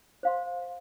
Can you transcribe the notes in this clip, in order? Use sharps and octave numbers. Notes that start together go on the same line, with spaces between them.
C5 F5 C6